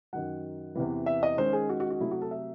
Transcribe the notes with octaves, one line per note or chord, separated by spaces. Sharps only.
F#2 D#3 F#3 F#5
E2 C3 E3
E5
D#5
D#3 G#3 C#4 C5
G#4
F#4
F#4
F#4
C3 F#3 A3 E4
F#4
A4
E5